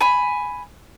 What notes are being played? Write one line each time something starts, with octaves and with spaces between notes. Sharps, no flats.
G#5 B5